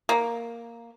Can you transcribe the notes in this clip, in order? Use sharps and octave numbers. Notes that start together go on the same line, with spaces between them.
A#3